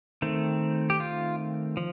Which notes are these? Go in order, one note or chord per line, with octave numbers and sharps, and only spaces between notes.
D#3 A3 C4
G4
F4
F3